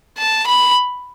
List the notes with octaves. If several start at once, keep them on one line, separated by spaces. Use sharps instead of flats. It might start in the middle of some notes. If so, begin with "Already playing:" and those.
A5
B5